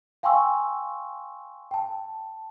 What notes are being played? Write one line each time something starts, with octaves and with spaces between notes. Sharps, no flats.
F5 G5 G#5 C6 C#6 E6
G5 A5